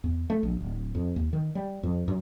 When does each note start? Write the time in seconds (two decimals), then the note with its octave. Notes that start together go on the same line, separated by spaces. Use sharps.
0.04 E2
0.30 A3
0.43 A#1
0.60 D1
0.95 F2
1.16 D#2
1.33 D#3
1.55 G3
1.83 F2
2.08 F#2